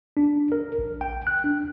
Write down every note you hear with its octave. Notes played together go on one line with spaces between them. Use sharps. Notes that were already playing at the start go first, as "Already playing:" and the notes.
D4
A#4
A#1
G5
F#6
D4